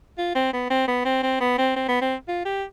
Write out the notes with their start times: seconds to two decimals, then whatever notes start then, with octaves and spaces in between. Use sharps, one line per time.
0.18 F4
0.35 C4
0.53 B3
0.70 C4
0.88 B3
1.05 C4
1.23 C4
1.40 B3
1.58 C4
1.76 C4
1.88 B3
2.01 C4
2.28 F4
2.45 G4